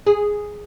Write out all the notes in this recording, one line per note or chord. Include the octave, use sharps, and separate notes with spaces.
G#4